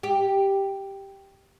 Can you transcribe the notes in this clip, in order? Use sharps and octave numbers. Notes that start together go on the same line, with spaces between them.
G4